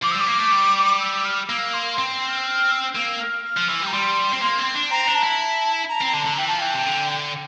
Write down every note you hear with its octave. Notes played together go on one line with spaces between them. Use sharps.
F3 D6
G3 E6
D6
A#3
A3
G3
E6
F6
A#3 E6
C6
C4 C6
E6
F6
E6
F6
E6
A#3 E6
F6
F6
F3
E3 E6
G3
A#5
G3 C6
C4
A#3
C4
D4
C4 A#5
D4
A5
E4
A#5
C4 A#5
D3 A5
D3
E3 G5
F3 A5
E3 G5
C3
D3